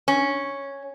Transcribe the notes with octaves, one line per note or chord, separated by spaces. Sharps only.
C#4